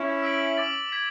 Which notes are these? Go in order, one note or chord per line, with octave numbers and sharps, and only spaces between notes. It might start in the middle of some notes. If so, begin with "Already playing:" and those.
Already playing: C#4 E4
E6 B6 D7 F#7
D6 A6 D7 F#7
G#6 B6 F#7